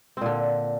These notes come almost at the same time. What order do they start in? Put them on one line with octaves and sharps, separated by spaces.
C4 A#2 D3